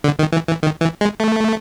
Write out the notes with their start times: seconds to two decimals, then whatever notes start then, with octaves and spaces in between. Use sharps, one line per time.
0.04 D3
0.19 D#3
0.32 E3
0.48 E3
0.63 D#3
0.81 E3
1.01 G#3
1.20 A3